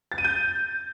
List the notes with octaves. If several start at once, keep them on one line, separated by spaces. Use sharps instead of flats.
A6
D#7
G6